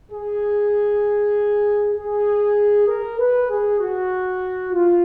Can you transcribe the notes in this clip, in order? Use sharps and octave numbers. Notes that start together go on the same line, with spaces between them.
G#4
G#4
A#4
B4
G#4
F#4
F4